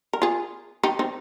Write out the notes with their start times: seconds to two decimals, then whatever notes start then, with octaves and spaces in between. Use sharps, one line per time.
0.13 A#4
0.22 F4 G#4
0.83 D#4 G4
0.99 C4 D#4